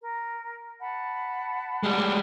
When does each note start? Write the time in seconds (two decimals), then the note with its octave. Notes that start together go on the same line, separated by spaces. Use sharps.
0.02 A#4
0.80 F#5 A5 B5
1.83 G3 G#3